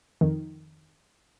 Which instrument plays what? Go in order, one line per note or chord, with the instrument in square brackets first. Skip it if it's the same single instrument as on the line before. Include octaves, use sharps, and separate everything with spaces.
[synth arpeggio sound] F2 D#3